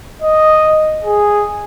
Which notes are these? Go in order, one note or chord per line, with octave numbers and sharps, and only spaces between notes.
D#5
G#4